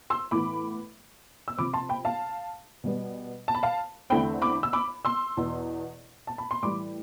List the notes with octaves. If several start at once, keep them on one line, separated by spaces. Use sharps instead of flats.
C6 E6
A2 E3 B3 B5 D6
E6
C3 F3 C4 B5 D6
A5 C6
G5 B5
F5 A5
B2 G3 B3
A5
B5
F5 A5
E2 D3 A3 C4 G5 B5
B5 D6
E6
B5 D6
C6 E6
E2 B2 B3
A5
B5
C6
A2 E3 G3 B5 D6